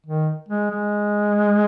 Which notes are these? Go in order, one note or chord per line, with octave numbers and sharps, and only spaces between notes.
D#3
G#3
G#3